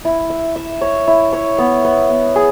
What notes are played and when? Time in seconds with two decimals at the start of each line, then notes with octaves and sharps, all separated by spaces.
0.05 E4
0.30 E5
0.56 E5
0.81 C#5
1.07 E4
1.33 C#5
1.58 B3
1.85 B3
2.09 B3
2.36 G#4